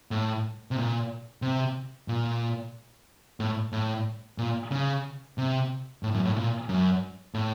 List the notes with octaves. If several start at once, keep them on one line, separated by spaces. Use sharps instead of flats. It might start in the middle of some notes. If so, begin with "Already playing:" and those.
A2
C3
A#2
C3
A#2
A2
A2
A#2
C#3
C3
A2
F#2
A2
A#2
F#2
A2